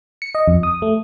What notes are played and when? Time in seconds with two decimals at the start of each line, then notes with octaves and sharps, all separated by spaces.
0.22 C#7
0.35 D#5
0.48 F2
0.63 D#6
0.82 A3